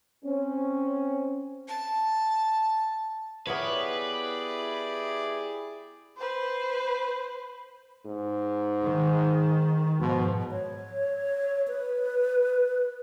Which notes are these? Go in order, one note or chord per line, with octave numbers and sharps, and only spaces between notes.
C4 C#4
A5
B3 E4 G4 G#4 A#4 B4 C#5 D5
B4 C5
G#2
D#3
G#2 B2 F3
C#5
B4